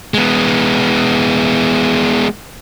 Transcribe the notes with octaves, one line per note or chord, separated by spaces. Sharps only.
G#3 B3